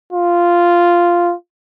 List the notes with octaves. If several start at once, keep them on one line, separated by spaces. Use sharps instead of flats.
F4